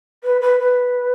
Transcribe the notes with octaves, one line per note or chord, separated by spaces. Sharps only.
B4
B4
B4